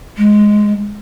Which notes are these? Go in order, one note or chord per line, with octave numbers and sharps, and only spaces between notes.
G#3